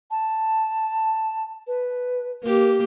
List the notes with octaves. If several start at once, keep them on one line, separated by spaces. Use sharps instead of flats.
A5
B4
A#3 G4 A#4